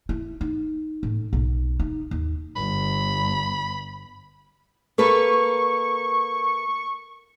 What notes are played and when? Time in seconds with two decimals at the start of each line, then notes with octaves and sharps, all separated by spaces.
0.09 E4
0.41 D#4
1.03 A2
1.33 B1
1.80 D#4
2.11 D#2
2.56 G1 B5
4.98 A#3 A4 B4 C#6